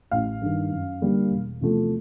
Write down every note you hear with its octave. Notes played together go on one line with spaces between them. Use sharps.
A1 F5
G2 D#3
F#2
D3 G3 A#3
E1
E2 C3 F3 A3